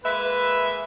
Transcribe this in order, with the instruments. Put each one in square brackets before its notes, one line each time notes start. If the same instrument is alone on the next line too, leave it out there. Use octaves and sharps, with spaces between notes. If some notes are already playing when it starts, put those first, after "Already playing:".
[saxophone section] G#3 A#3 E5 [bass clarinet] B4